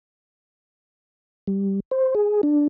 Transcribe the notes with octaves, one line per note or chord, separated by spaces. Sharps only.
G3
C5
G#4
D4